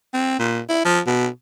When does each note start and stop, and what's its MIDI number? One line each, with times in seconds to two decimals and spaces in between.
0.14 0.37 60
0.39 0.61 46
0.69 0.82 64
0.85 1.00 53
1.07 1.27 47